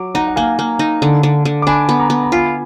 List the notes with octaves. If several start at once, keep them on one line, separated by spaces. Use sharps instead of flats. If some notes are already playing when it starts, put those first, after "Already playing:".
Already playing: F#3 D6
D#4 F#5 A#5
F#5
A#3 F5 G#5
A#3
D#4
D3
D3
D3
D6
D4 G#5 B5
B3
A#5 D6
B3
A#5
F4 G#5 B5